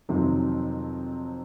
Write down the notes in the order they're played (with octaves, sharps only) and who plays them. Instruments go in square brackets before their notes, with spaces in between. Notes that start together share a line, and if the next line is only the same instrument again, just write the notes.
[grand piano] F2 C3 D#3 F#3